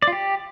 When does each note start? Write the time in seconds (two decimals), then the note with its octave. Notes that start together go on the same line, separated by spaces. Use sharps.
0.02 D5
0.08 F4
0.13 G4